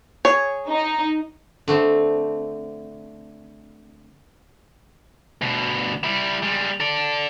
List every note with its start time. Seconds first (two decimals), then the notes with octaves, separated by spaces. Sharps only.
0.25 G#4 C#5
0.69 D#4
1.68 D3 A3 C4
5.42 D2 B2
6.04 G3 E4
6.43 G3 G#3
6.80 A4 D5